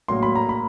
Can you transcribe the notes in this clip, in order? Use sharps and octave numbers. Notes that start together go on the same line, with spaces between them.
A2 F#3 A#3 C6
B5
A#5
B5